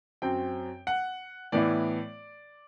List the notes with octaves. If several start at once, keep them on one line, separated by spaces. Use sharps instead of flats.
F#2 F#3 C4 G5
F#5
A2 E3 B3 E4 D5